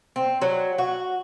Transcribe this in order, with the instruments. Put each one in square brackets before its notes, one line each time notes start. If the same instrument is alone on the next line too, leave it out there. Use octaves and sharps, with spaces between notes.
[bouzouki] C4
F#3
F#4